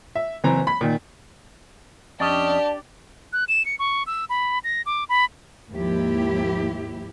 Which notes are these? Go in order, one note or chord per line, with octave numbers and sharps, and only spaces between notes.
E5
F#1 E3 C4 A#5
B5 B6
A#2 D#3
F2 C#4 D4 G4 D5 D#5 A5
F#6
E7
C#7
C#6
E6
B5
A#6
D6
B5
D#2 G#2 F3 A#3 E4 G4